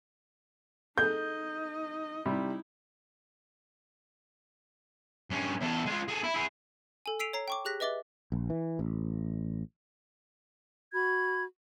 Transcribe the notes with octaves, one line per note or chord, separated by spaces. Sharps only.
D#4 G#4 A4 D#5 G6
C3 G3 D#4 E4
G2 C#4
E2 A4
G#3 F4
G#4 A4
E4
E4 G#4
A4 G#5
E6 B6 C7 D7 D#7 F7
C#5 A#5 C7
G5 C#6 D6
G4 G#4 F#6 A#6 B6
B4 D#5 E5 D6 A6 G7
A#1
E3
A1
F#4 B5 G#6